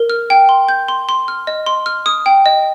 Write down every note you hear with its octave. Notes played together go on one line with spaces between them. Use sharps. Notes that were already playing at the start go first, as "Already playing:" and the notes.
Already playing: A#4
F6
G5
C6
G6
C6
C6
F6
D#5
C6
F6
D#6
G5
D#5